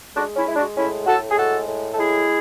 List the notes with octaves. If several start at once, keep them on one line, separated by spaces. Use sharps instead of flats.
G#3 D4 F#4
C#4 E4
G#3 E4
D4 F#4
A2 C#4 E4
A2 F#4 A4
G#4
G#3 F#4 A4
A2
A4
G#3 E4 G#4